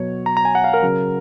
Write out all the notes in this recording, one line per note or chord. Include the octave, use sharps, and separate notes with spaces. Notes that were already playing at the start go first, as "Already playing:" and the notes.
Already playing: B2 F#3 C#5
A#5
A#5
G#5
F#5
F5
A#4
C#3 F#3